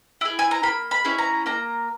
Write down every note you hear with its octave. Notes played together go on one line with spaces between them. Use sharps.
E4 G#4
G#5
A#5
A#3 B5
B5
C#4 E4 G#4
A#5
A#3 A#5